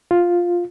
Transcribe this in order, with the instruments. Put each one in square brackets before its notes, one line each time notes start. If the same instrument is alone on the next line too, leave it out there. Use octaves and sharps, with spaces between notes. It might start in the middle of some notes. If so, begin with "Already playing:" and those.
[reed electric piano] F4